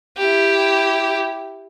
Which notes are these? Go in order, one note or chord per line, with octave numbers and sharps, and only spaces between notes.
E4 G4